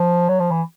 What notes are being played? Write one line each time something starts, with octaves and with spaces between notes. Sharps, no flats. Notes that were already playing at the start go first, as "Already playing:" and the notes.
Already playing: F3
F#3
F3
E3